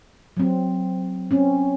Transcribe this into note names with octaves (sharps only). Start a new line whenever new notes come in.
F#3 C4
C4 C#4